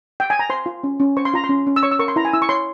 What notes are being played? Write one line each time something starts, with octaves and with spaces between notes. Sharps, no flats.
G5
G#5
A#5
C5 C6
F4
C#4
C#4
C5 C#6
C6
F4 A#5
C6
C#4
C#4
E6
C#5 C#6
E6
A#4 C#6
C6
E4 A#5
G#5
E4 E6
C#6
C#5 C6